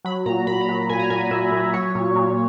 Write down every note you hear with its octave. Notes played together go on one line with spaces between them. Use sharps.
F#3 B5
A#2 A#5
A#2 B5
A#5
F#3
A#2 G#5
A#5
A#2 G#5
G#5
A#2 E5
A#2
F#3 C#5
A#2
A#2